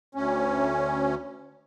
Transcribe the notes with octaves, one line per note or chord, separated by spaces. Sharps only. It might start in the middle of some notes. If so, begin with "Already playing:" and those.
D2 C#4